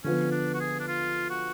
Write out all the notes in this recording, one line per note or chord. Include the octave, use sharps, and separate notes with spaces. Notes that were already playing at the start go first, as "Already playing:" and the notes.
D3 F3 B3 C#4
D4
F#4
G#4
D4
F4
F#4